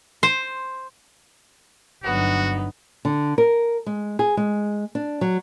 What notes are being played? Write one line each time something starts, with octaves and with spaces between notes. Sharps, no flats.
C5
G1 F#3 B3 D4 D#4 F#4
D3
A#4
G#3
G#4
G#3
D4
F#3